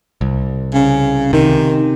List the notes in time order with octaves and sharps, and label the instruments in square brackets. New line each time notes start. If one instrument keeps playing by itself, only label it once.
[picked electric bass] C2
[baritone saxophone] C#3
[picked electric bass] C3 [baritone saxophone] D#3